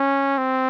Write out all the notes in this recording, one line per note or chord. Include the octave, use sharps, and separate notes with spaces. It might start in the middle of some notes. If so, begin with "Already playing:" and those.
Already playing: C#4
C4